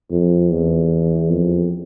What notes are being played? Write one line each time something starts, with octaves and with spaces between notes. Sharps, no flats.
F2
E2
F2